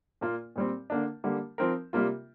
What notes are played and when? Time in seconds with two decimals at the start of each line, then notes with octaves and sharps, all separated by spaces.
0.21 A#2 A#3 F4
0.56 A#2 G3 C4
0.90 D3 A#3 D4
1.24 D3 G3 A#3
1.58 F3 C4 A#4
1.93 C3 G3 A#3 F4